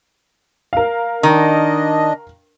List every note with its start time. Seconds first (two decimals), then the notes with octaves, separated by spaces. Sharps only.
0.73 A#4 F5
1.23 D#3 D4 D#5